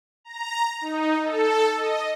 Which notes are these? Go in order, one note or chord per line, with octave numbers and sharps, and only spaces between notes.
A#5
D#4
A4
D#5